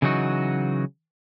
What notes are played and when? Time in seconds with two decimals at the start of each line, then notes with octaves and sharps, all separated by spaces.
0.02 C#3 E3 F#3 D#4 F#4